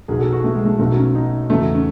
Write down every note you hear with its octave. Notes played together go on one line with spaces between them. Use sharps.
B1 B2 F#3 G#4
A4
F#4
A3
G#3
A3
B1 B2 F#3 A3
C#4
D#4
E2 C#3 F#3 A3
C#4